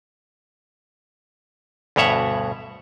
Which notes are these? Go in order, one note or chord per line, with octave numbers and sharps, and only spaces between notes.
D2 G2 B2 C#5 E5 F#5